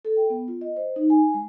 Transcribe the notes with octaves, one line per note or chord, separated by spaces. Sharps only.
A4
G5
B3
F4
D#5
C5
D#4
G#5
G#3